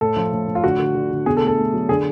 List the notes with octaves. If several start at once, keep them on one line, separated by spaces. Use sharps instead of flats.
A2 A4
F3
A2
A2
F4
D3 F#4
D3
D3
D3
B2 G#4
A4
A3
A4
A3
F#3
D3 G#4